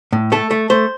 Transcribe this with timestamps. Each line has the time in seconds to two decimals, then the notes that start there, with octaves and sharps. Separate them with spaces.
0.13 A2
0.32 A3 A4
0.51 A3
0.70 A3 C5